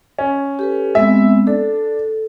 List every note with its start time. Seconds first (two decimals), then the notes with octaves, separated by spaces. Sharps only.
0.19 C#4
0.59 G4 A4 B4
0.95 G#3 B3 C4 E5
1.47 D4 A4